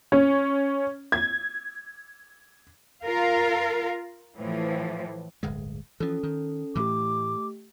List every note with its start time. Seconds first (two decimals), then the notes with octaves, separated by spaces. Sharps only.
0.12 C#4
1.12 G#6
3.04 F4 A#4 F5
4.37 A2 E3 F3
5.43 D1 G1 G#3
6.00 E3 F3 C#4 A4
6.23 D#3
6.76 A2 E3 A3 G4 D6